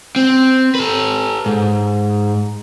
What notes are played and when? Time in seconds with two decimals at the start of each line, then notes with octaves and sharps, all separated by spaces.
0.16 C4
0.75 A4 B4
1.46 G#2